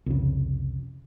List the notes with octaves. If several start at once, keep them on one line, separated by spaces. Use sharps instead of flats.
C2 F2 C#3